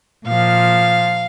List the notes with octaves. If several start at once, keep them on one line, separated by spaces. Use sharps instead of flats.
A#2 F3 F5